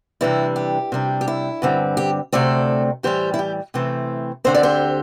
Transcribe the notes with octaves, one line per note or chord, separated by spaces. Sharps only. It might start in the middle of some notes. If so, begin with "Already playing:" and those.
C3 E3 G3 D4 E4
G4
C3 G3 D4
G4
E4
G2 D3 G3 C4
G4
D2 C3 A3 C4 A4 D5
A2 E3 G3 G4 C5
E4
G4
C3 E3 A3 C4
D2 D3 C4 C5
D5
G4 C5